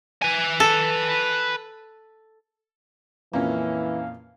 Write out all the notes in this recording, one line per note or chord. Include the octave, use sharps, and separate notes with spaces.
B4 G#5
A4
F2 A#2 E3 A#3 C#4 F5